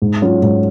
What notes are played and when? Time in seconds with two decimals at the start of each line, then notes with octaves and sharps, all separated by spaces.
0.02 G#2
0.22 F#3 C#4 F4
0.42 G#2